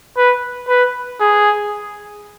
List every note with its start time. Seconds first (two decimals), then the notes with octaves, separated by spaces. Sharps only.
0.17 B4
0.68 B4
1.20 G#4